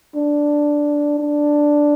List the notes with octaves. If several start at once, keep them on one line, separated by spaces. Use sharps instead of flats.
D4
D4